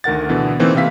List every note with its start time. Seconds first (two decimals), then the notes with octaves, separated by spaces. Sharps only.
0.04 D2 D#3 A#4 F#5 A6
0.29 B2 D3 E3 B3
0.60 E3 A3 A#3 C4 D#4
0.74 C3 E3 C4 E5 F5 B6